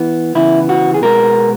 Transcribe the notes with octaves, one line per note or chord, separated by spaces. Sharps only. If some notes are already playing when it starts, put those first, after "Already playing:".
Already playing: E3 B3
C#3 E3 B3 E4
F#4
G#4
B2 G#3 B3 A#4